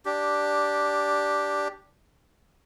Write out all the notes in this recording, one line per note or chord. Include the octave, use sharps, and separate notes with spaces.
D4 G4